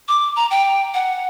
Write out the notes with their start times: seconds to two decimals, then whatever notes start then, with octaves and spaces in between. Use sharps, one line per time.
0.08 D6
0.36 A#5
0.51 G5
0.94 F#5